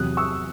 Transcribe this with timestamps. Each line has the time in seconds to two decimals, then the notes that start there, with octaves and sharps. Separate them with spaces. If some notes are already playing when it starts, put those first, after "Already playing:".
Already playing: E2 C3 F#3 D#6 F#6
0.17 C#6 E6